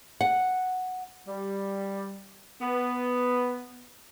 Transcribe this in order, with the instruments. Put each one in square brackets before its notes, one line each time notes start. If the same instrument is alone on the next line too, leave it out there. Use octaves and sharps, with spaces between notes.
[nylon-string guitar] F#5
[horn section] G3
B3